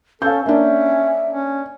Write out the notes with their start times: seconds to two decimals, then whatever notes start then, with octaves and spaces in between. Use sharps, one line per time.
0.22 C#4 A4 F5 G6
0.46 A#3 C#4 D4 E5
1.30 C#4